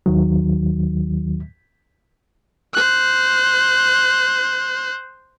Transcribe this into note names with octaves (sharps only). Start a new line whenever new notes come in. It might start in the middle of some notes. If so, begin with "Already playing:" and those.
D#2 D#3 F#3
C5 F#6